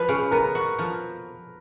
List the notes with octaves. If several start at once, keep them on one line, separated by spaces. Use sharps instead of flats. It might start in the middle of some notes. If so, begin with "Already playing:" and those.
Already playing: F3 B4
C#3
B3 A#4
F#4
F3